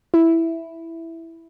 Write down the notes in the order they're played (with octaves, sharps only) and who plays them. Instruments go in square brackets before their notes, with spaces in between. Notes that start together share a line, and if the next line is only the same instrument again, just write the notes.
[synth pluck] E4